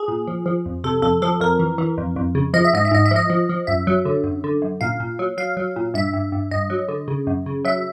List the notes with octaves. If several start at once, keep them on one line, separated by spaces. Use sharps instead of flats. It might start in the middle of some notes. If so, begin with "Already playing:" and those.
Already playing: G#4
A#2
F3
F3
F2
C3 A4
F2 A4
F3 A4
F2 A#4
E3
E3
F2
F2
C#3
F3 D#5
E5
G#2 D#5
E5
G#2 D#5
E5
F3 D#5
F3
F3
F#2 E5
F#3
D3
F#2
D3
F#2
A#2 F5
A#2
F#3
F#3 F5
F#3
A#2
G2 E5
G2
G2
G2 D#5
F#3
D3
C#3
F#2
C#3
F#3 E5